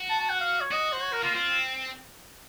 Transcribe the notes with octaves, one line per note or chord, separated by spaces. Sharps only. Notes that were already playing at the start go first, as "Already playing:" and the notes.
Already playing: F#4
A5
A5
F#5
F5
C#5
F#4 D#5
C5
C#5
A#4
A#3 F4
C4 F4